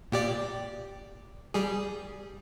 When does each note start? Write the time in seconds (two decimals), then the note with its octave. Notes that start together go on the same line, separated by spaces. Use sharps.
0.12 A#2 G4 D5
1.54 G3 G#4